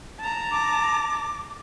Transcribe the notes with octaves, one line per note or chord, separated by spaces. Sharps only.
A5 A#5
D6